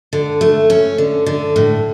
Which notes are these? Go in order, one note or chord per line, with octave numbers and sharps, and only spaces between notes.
D3
A3
C#4
D3
D3
A2